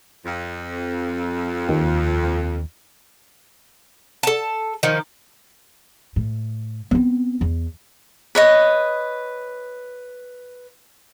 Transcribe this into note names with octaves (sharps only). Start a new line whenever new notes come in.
F2
D#2
A4 A5
D#3 F3 D#4
A2
B3 C4
E2
B4 C#5 D#5